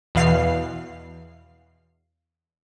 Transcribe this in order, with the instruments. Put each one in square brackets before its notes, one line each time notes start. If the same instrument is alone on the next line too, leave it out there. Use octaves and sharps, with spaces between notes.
[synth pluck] E2 B2 E3 F5 C7